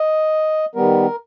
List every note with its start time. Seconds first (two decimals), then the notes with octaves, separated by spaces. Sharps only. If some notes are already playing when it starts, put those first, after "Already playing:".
Already playing: D#5
0.75 D#3 G3 B3 A#4